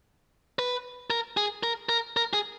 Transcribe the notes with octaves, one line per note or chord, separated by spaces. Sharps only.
B4
A#4
G#4
A#4
A#4
A#4
G#4